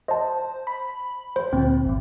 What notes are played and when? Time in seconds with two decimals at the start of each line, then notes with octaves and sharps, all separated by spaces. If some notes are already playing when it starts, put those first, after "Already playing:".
0.08 C5 D#5 A5
0.67 B5
1.36 C5
1.53 D2 A#2 C4
1.85 G#1 D#2